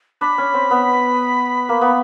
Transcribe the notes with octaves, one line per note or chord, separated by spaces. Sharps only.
D4 B5
C#4
C4
B3
A#3
B3